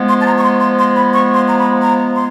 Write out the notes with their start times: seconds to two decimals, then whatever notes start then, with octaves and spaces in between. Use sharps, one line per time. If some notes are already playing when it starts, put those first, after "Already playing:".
Already playing: F3 G#3 B3
0.09 C6
0.20 A5
0.27 A#5
0.37 C#6
0.43 C6
0.60 C6
0.77 C6
0.95 B5
1.13 C#6
1.35 C6
1.48 A#5
1.58 B5
1.81 A#5
2.15 C6